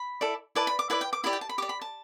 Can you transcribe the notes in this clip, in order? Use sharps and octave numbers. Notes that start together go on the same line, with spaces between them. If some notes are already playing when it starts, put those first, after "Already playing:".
Already playing: B5
E4 A4 D5
E4 B4 D5 A5
B5
D6
E4 B4 D5 B5
G5
D6
E4 G4 D5 B5
G5
A5
B5
G4 D5 D6
B5
A5